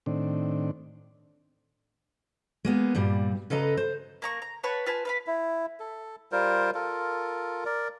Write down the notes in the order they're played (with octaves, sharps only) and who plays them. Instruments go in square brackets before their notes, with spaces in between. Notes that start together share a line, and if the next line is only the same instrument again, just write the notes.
[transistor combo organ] A2 D#3 C4 D4
[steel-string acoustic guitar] G#3 A#3 B3
G2 A#2 G3
C#3 A4 B4 D#5 A#5
C5
[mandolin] A#3 A#5 C#6
A#5
B4 C#5 F#5 A5
F4 B4 G#5 A5
B4 F5 B5
[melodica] E4
A4
G3 F4 A#4 C5
F4 A4 A#4
A#4 D5